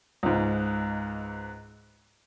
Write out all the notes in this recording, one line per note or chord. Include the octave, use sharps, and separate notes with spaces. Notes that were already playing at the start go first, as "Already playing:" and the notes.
C#2 G#2